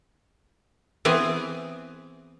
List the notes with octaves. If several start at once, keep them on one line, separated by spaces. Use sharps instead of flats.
E3 B3 C4 G#4